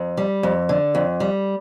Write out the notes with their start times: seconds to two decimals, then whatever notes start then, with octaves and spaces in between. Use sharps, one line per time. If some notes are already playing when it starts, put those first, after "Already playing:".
Already playing: F2
0.17 G3
0.43 F2
0.69 D3
0.95 F2
1.20 G3